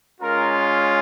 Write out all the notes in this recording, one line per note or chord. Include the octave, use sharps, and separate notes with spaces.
G#3 C#4 F4 A#4